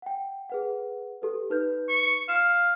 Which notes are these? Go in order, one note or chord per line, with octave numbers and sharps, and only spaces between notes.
F#5 G5
G#4 B4 F#5
G4 A4 B4
D#4 B4 G6
C#6
F5 E7